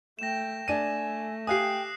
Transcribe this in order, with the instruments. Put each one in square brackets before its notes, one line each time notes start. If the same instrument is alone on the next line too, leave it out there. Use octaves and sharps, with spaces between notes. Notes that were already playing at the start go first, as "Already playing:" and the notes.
[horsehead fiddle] A3 G5 [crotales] A#6 E7
[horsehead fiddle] A3 [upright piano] D4 D#7 [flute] G#5
[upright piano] G4 F5 G#5 [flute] G5 [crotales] D#6 F#6 C7